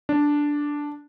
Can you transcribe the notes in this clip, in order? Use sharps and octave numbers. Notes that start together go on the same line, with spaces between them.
D4